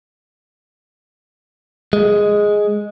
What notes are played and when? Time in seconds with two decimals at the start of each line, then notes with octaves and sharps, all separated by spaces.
1.93 G#3